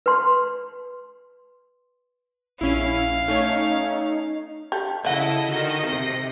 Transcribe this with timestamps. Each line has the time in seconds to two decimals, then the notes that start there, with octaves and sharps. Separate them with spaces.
0.06 B4 C6
2.61 A#1 C#4 E4 F5
3.28 A3 C#4 D#4 C#5
4.72 G4 A4
5.05 C#3 E4 A4 D#5 E5 F#5
5.47 D3 D#3 F#4
5.84 C3 A3 A#6